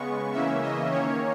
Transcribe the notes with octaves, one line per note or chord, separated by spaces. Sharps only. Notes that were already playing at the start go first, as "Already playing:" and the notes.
Already playing: C#3 G#3 B3 C#6
C#3 E3 A#3 C#4 E5
D#5
D#3 A#3 C#4 C#5